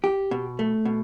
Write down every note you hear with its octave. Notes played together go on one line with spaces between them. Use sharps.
G4
B2
A3
B2